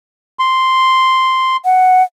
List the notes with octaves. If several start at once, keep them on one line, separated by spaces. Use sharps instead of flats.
C6
F#5